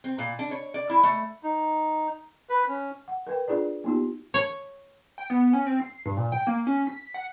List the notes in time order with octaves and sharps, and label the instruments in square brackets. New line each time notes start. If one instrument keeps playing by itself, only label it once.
[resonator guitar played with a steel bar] C4
A#2
D4
C#5
D5
E4
A3
[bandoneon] D#4
B4
C#4
[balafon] F#5
A#4 B4 G5
D4 F4 G#4 D5
A#3 B3 D#4 F4 G4
[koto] C#5
[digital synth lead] G5
B3
C#4
C4
C7
G2
A#2
G5
A#3
C#4
B6
F#5